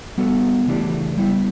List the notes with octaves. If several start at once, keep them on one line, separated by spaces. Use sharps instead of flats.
G3 B3 F#4 A4
C#3 E3 A3 D4 G4
G3 B3 E4